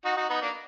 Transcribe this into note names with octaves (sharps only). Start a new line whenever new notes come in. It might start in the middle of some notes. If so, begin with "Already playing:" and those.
D#4 F#4
D#4 F#4
B3 D#4
A#3 D4